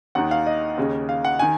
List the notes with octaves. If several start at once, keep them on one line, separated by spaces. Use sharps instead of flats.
D#2 D#3 F#5
F5
D#5
D#2 C#3
F5
F#5
D#3 G#5